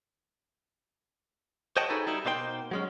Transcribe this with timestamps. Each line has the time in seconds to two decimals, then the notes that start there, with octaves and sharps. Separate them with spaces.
1.77 C5 C#5 D#5 F#5 G5 A5
1.90 D#4 F#4 G#4 A4 B4
2.07 G3 D#4 E4
2.25 B2 A#3 D#4 C5 D5 G5
2.71 F#3 G#3 C#4